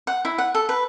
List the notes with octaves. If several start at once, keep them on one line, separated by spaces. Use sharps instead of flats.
F#5
E4
F#5
A4
B4